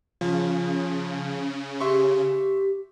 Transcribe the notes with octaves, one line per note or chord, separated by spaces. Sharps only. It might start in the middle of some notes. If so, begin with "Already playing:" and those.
C#3 F3 C#4
G4 E5 C6 C#6